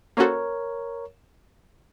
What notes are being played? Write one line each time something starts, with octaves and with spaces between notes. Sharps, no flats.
A#3 C#4 F#4 A4 A#4 C5 C#5